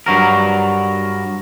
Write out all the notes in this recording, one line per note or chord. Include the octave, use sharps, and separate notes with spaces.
G2 F#3 A#4